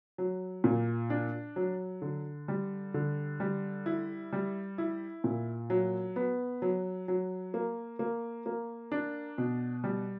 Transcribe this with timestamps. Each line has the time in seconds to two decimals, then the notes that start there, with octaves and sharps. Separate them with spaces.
0.18 F#3
0.64 A#2
1.10 D4
1.56 F#3
2.02 D3
2.48 G3
2.94 D3
3.40 G3
3.86 E4
4.33 G3
4.78 E4
5.24 A#2
5.70 F#3
6.16 B3
6.62 F#3
7.08 F#3
7.54 A#3
7.99 A#3
8.46 A#3
8.92 D4
9.38 B2
9.84 G3